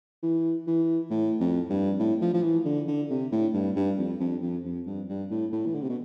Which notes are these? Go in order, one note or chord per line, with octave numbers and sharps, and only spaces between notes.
E3
E3
A2
F2
G2
A2
F3
F3
E3
D3
D3
C3
A2
G2
G2
F2
F2
F2
F2
G2
G2
A2
A2
E3
D3
C3
B2